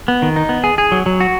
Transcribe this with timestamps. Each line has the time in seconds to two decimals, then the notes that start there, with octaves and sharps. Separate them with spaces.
0.08 B3
0.22 D#3
0.36 D#4
0.49 B3
0.64 G#4
0.78 G#4
0.92 F#3
1.06 F#3
1.20 F#4